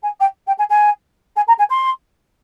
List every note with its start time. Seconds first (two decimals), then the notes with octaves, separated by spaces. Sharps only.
0.02 G#5
0.20 G5
0.47 G5
0.58 G#5
0.69 G#5
1.36 G#5
1.48 A#5
1.58 G#5
1.70 C6